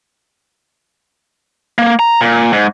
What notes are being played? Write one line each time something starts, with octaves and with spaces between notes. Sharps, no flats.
A#3
A#5
A#2
G#2